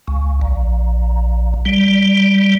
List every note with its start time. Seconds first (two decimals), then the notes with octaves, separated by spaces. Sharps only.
0.08 C#2
0.41 A#1
1.65 G3